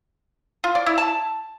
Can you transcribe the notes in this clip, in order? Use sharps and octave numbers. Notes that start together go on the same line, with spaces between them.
F4
D5
E4
A5